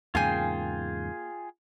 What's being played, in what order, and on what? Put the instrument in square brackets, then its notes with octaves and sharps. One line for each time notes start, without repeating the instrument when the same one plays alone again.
[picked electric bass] E2 G#2 C#3 [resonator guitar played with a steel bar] A#3 G#5 [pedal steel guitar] F4 G#4 G5